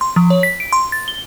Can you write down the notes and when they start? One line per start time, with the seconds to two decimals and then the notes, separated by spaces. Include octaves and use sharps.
0.01 C6
0.16 F3
0.30 C#5
0.43 B6
0.60 D7
0.73 C6
0.92 A6
1.08 G7